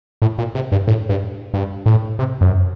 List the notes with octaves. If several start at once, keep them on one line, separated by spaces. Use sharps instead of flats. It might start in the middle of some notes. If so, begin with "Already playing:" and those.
A2
A#2
C3
G2
A2
G2
G2
A2
C3
F#2